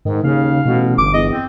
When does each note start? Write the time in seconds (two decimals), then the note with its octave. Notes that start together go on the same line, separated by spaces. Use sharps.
0.05 G#2 D#3
0.24 D#2 C#3 F5
0.66 A1 B2
0.98 G1 D6
1.14 E2 D#5
1.32 C4